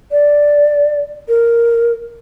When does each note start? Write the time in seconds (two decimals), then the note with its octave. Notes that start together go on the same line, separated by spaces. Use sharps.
0.11 D5
1.28 A#4